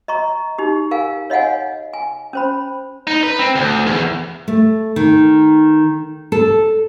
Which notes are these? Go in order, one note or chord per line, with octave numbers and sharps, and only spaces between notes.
D#5 A#5 C#6
D#4 G4
A#4 F5 G#5
C#5 D#5 F5 F#5 G#5
G#5
C#4 C5 B5
D#4
B4
C4
D2
E2
A3
D#3
A4